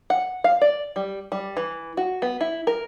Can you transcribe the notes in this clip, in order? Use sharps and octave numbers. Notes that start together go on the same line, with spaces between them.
F#5
F5
D5
G3
G3
E3
F#4
B3
E4
A#4